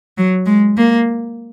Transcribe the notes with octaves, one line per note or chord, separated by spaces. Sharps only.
F#3
G#3
A#3